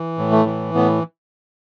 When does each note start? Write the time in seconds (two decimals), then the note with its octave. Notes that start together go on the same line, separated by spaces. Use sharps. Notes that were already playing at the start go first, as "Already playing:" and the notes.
Already playing: E3
0.18 A2
0.32 A3
0.46 E3
0.74 A2 B3